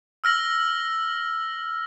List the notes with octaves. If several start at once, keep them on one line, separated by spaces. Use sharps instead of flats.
E6 F6 A#6 F#7